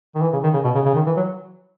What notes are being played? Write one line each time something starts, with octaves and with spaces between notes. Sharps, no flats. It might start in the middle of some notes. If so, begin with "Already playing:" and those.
D#3
E3
C#3
D#3
C#3
B2
C#3
C#3
D#3
E3
F#3